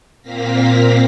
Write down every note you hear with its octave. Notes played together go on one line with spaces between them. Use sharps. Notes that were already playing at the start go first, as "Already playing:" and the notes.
A#2 A#3 C4 F5 A#6 B6